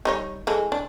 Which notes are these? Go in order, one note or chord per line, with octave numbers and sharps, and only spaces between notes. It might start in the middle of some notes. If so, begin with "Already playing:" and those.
G3 D#4 C#5
E3 G#3 A4
D4